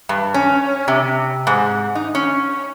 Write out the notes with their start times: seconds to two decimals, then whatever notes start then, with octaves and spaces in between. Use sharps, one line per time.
0.09 G2
0.34 C#4
0.88 C3
1.47 G#2
1.95 D#4
2.15 C#4